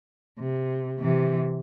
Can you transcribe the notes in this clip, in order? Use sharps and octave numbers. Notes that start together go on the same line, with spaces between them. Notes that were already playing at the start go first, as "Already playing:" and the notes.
C3
C3 E3